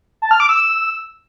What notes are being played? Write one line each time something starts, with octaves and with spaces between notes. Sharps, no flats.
A5
F6
D6
E6